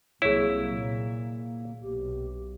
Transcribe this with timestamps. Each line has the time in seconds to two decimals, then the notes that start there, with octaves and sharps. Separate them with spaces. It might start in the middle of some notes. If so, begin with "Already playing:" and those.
0.22 C2 F#3 A#3 E4 G#4 C#5
0.69 A#2
1.82 B1 G4